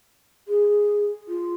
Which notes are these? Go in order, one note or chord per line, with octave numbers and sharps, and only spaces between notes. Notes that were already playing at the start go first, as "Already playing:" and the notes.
G#4
F4